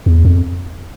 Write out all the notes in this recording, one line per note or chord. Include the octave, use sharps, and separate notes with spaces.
E2
F2